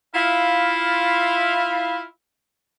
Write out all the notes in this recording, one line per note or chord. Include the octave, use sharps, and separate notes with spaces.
E4 F4 F5